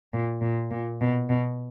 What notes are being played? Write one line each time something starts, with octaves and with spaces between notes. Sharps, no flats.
A#2
A#2
A#2
B2
B2